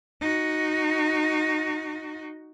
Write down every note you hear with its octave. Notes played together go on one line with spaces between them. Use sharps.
D#4 F#4